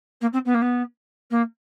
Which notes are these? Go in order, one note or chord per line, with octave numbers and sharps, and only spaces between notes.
A#3
C4
B3
A#3
B3
A#3